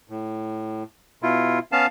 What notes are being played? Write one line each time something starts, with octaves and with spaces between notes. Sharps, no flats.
A2
B2 E4 F4
B3 C#4 F5 A5